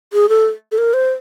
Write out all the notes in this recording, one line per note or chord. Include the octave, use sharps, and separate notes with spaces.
G#4
A4
A4
A#4
C5